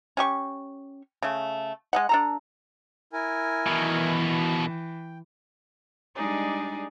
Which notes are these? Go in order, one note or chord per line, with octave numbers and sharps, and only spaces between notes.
C#4 G4 C#6
C#3 A3
G#3 D#5 F#5
D4 A4 A#5
E4 A#4 G#5
B2 D#3 E3
G5
G3 G#3 D4 D#4 G#4 D5